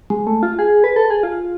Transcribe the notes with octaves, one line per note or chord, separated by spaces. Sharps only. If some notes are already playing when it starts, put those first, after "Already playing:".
G#3
A3
F4
G#4
B4
A4
G#4
F4